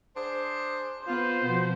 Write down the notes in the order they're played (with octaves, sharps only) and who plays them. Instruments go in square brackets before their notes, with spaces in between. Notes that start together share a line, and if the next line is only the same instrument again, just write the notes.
[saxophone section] D4 G#4 C5
[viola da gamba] B3 B4 [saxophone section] F4 [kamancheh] C5
[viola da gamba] B2 F3 [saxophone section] B3